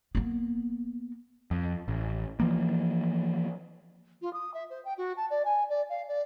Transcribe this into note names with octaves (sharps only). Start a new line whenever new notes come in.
A#3 B3
F2
A1
E3 F3 A#3
F4
D#6
E5
C5
G5
F#4
A5
D5
G#5
D5
F5
D5